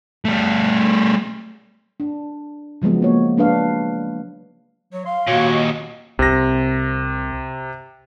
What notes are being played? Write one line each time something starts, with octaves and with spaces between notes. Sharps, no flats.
G3 A3
D4
C#3 F3 F#3 G#3 B3
A#3 C#5
G#3 D4 B4 F5
F#3 C#5
F5 C6
D#2 A#2 F#4 C#5
D#5
C2 C3 A#6